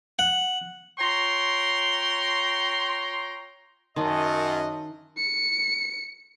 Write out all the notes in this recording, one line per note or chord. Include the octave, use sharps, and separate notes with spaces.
F#5
F4 C#5 G5 A#5 C6
F#2 D#3 D#5 E5 A5 C6
C#7